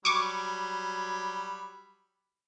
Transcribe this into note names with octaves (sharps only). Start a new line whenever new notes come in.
F#3 G3 B5 C#6 D6